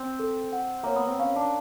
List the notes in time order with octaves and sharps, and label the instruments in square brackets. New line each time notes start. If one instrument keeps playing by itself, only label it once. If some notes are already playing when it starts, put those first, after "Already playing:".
Already playing: [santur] C4
[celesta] A4
F#5
[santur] A#3 [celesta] C#5
[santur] B3
C4
[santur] C#4 [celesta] F5
[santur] D4